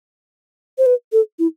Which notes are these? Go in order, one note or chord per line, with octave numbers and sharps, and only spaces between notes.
C5
B4
A4
E4